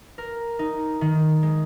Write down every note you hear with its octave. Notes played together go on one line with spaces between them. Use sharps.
A#4
D#4
D#3
G#3